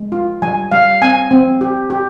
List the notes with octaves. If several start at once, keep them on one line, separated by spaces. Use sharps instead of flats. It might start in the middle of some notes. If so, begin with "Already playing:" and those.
Already playing: G#3
F4
G3 G#5
G3 F5
C4 G#5
C4
G4
G4